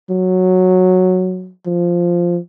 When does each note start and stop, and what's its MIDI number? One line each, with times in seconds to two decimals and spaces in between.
0.10 1.51 54
1.66 2.38 53